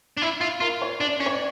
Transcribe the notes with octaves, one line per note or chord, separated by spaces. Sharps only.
D4
E4 E5
F4 E5
F4 A#4
C#5
D4 D5
C#4
C#5
D5